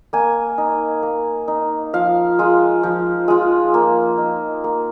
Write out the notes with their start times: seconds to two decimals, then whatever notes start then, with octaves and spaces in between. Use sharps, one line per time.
0.13 A#3 G#5
0.58 D#4
1.03 A#3
1.48 D#4
1.94 F3 F5
2.39 G#3 F4
2.83 F3
3.28 G#3 F4
3.74 A#3
4.18 D#4
4.64 A#3